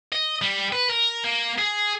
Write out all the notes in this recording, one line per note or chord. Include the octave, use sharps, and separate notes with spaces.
D#5
G3
B4
A#4
A#3
G#4